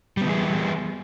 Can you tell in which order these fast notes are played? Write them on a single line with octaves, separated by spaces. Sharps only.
G3 B3 E3 G#4